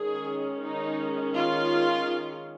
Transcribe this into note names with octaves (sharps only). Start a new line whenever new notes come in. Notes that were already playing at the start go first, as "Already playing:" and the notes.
Already playing: D#3 G#3 C#4 G#4
D#4
F4